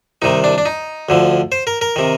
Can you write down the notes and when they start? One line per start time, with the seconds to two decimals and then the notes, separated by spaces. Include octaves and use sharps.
0.22 C2 C3 D#3 D#4
0.44 D4
0.58 D4
0.66 D#4
1.09 D2 D3 F3
1.52 C5
1.67 A#4
1.81 A#4
1.96 C3 D#3